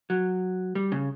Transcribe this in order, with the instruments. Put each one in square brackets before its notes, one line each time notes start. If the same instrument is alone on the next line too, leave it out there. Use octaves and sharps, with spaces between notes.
[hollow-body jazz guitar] F#3
G3
C#3